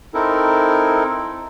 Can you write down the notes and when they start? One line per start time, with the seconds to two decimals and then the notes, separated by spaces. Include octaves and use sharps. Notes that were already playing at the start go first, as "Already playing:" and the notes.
0.14 C4 D#4 E4 A4 A#4